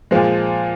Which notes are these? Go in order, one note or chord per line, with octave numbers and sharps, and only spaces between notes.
A#2 F3 G#3